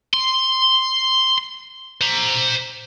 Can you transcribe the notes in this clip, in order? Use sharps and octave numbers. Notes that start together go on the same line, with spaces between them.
C6
C5 A#5